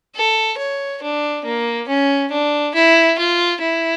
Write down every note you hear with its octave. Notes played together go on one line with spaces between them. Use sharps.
A4
C#5
D4
A#3
C#4
D4
E4
F4
E4